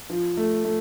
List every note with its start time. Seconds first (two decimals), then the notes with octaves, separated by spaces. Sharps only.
0.10 F3
0.37 A3
0.65 A3